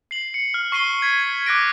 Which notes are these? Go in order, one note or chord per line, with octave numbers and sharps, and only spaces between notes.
C7 F#7
C#7
F6
C#6 C7 D#7 G7
G#6 B6
D6 F#6 A#6 D7